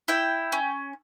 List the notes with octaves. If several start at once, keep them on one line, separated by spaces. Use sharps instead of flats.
E4 G5
C#4